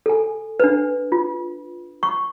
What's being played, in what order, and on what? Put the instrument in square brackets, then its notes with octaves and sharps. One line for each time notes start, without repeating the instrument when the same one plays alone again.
[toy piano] A4 G#5
D4 B4
F4
C#6